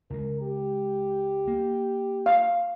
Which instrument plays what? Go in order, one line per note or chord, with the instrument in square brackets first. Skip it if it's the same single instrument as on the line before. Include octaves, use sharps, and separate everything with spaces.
[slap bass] C#2 C#3 G#3 [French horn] A#4
[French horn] G4
[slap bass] A#3
[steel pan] F5